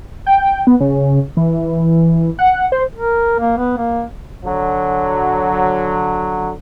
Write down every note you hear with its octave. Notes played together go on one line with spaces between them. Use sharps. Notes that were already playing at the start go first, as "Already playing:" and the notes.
G5
B3
C#3
E3
F#5
C5
A#4
A#3
B3
A#3
D3 F#3